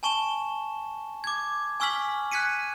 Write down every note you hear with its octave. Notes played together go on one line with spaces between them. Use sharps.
G#5 A5 C#6 E7 G7
D6 G#6
G#5 C#6 E6 F6 B6 F#7
F#6 G#6 B6 C#7 D#7